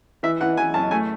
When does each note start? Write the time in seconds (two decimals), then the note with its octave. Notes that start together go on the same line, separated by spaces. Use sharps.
0.23 E3 E5
0.41 E3 F#5
0.57 E3 G#5
0.74 F#2 A5
0.91 A3 G#5